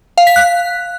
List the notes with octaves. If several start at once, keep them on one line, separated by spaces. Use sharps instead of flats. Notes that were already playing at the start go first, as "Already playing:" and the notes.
F5
B6
F#6